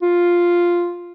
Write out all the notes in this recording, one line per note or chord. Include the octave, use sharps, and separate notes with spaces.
F4